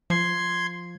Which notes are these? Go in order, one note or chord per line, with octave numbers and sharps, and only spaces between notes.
F3 C6 G#6